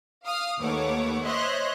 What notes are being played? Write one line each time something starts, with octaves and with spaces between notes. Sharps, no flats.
F5 D#6 F6
D#2 A3 B4 C#5 F#5 D6
C5 C#5 D#5 E5 C6 F#6